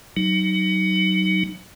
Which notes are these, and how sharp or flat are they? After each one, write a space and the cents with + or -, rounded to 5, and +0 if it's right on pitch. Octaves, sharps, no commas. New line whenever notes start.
F#3 +25 D#4 +0